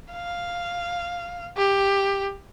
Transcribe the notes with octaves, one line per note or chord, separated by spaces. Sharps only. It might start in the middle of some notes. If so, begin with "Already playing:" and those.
F5
G4